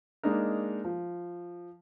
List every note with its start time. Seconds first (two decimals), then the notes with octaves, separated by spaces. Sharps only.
0.23 G#3 A#3 D4 D#4 A#4
0.85 F3